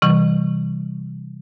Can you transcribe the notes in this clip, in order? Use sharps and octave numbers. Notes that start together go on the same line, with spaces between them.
C3 E3 G3